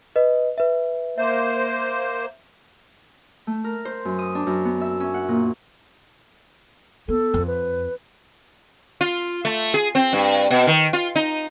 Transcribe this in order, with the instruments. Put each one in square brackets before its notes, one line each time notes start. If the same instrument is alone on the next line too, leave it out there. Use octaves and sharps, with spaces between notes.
[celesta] B4 D#5
B4 E5
[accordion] A#3 C5 [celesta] E5
[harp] A3
A#4
C5
F#2
D#6
D4
F#2
B3
E5
C#4
F#5
A#2
[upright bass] B3 [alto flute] A4
[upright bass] F2
[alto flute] B4
[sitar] F4
A3
G#4
C4
G2
B2
D#3
F4
D#4